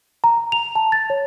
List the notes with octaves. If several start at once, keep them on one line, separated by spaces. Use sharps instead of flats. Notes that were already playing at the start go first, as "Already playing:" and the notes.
A#5
F7
A5
A6
C#5